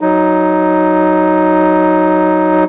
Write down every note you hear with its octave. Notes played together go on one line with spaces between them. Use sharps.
F#3 D#4